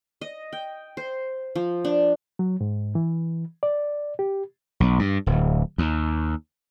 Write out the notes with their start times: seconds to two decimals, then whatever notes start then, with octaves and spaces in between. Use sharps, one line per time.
0.21 D#5
0.53 G5
0.97 C5
1.55 F3
1.85 D4
2.39 F#3
2.61 G#2
2.95 E3
3.63 D5
4.19 G4
4.80 B1
4.99 G2
5.26 D1
5.78 D#2